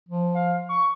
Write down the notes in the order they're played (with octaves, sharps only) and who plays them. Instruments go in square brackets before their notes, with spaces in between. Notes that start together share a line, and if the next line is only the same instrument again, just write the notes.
[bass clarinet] F3
[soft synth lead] F5
C#6